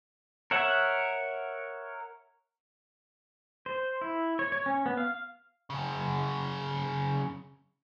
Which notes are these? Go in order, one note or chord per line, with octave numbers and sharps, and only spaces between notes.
A#4 C#5 E5 F#5
C5
E4
C#5
C#5
C#4
B3
F5
F#2 C#3